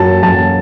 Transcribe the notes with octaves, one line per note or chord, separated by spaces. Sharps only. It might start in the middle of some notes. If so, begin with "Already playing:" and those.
Already playing: F#2 F#3 A5
F#2 A5